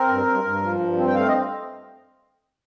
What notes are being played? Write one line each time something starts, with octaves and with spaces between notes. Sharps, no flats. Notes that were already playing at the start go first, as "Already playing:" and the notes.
Already playing: C4 A#4
G2
G2
G2
F3
G2
C4
G5
A3 F5
D#5